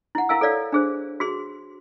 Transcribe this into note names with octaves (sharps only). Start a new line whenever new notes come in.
E4 F#5
E4 A#4 F5 G#5 E6
A4 C#5 D5 F5
D4 G#4 C5
F#4 G#4 C6